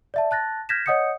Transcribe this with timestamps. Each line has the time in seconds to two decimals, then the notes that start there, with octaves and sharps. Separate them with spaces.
0.14 D5 E5 A5
0.31 A5 F#6 A6 A#6
0.69 F6 G6 G#6 A#6 B6 E7
0.86 C#5 D#5 F#5 D#6 G6 C#7